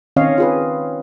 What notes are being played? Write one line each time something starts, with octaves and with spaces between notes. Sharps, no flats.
D#3 C4 C#4 C#5 D#5 F5
F4 G#4 B4